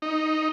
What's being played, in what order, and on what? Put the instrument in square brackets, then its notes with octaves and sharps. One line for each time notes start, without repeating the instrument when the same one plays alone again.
[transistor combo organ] D#4